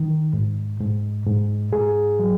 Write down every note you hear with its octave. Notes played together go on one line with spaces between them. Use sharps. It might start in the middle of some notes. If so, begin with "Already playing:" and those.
Already playing: D#3
G#2
G#2
G#2
G#2 G#4
F#3